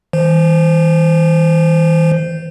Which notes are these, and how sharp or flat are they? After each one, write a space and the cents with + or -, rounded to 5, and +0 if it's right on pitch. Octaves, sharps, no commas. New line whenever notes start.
E3 -40 C5 -10